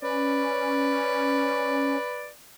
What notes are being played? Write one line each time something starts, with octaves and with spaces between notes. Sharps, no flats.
C#4 B4 D5